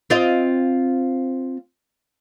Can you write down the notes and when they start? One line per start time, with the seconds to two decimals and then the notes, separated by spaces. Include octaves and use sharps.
0.10 C4 F4 D#5